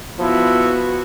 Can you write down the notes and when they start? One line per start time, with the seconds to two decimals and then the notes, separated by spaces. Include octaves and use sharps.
0.19 F3 B3 E4 F#4